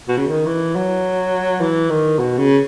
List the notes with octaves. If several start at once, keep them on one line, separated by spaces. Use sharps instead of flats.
B2
C#3
D#3
E3
F#3
E3
D#3
B2
C#3